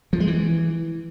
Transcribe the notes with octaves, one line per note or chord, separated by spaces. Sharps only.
F3
G#3
E3